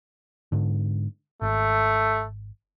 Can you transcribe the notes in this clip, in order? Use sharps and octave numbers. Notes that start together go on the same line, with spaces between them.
G#2 D3
G#1 A3